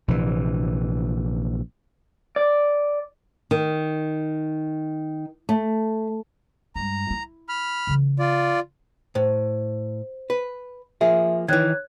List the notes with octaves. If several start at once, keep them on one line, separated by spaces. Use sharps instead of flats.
A#1 C3 E3
D5
D#3
A3
G2 G#3 A#5
E4
B5 F6
C#3 E3
F4 D5
A2 C5
B4
F3 A#3 G#4 E5
D#3 E3 C#5 F#6 G#6